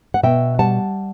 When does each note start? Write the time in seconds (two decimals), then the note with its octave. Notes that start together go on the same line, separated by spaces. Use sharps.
0.14 F#5
0.23 B2 E5 G5
0.59 G3 F#5 A5